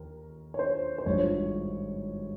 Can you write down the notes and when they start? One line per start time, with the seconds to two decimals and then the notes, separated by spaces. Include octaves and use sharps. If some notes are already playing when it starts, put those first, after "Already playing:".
Already playing: D#2 A#4
0.54 C#5
0.59 C5
0.98 C5
1.06 G#1 G2 F3 C#5